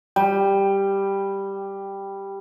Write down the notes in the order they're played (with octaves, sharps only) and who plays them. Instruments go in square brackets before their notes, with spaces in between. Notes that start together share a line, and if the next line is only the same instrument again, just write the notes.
[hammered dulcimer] G3 [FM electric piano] G5